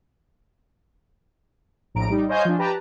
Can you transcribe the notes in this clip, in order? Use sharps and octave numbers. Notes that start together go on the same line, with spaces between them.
A#1 A2 A#5 D7
G3 D#4
C5 C#5 D#5 F5 G#5 G6
F3 D4
G4 B4 A5 A#5